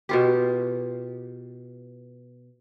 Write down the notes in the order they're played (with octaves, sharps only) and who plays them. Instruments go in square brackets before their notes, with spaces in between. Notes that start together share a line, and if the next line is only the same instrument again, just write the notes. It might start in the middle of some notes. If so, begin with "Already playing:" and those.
[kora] B2 F4 G4